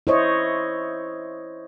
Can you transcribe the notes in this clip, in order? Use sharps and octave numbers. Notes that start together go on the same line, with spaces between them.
E4 C5 C#5 D#5